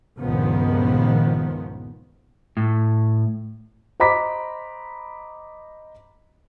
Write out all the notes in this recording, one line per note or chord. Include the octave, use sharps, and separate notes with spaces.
C#2 G2 A#2 D#3 F3 B3
A2
C5 D#5 A#5 B5 D6 B6